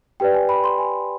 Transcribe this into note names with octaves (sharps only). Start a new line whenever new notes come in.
G4 B4 D5 G5
G#5
B5
C6
G#5